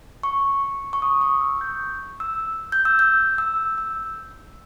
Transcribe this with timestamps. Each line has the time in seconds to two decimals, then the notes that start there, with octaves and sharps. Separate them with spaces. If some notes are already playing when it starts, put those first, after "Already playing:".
0.23 C#6
0.93 C#6
1.02 D#6
1.21 C#6
1.41 E6
1.61 G6
2.20 E6
2.72 G6
2.85 E6
2.99 G6
3.38 E6
3.78 E6